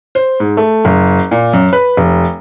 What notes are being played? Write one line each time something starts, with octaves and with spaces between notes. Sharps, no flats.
C5
G#2
A3
F#1
A#2
F#2
B4
F1